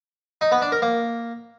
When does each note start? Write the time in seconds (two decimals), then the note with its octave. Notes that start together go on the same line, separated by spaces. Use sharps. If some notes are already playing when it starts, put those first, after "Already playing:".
0.41 D#4
0.52 B3
0.62 D4
0.72 A#4
0.82 A#3